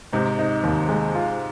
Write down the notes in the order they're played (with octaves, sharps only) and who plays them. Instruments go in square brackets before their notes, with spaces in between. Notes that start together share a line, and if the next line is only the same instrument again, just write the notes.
[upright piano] G#2 C3 [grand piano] D#4
[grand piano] D#4
D#2
G#3
F4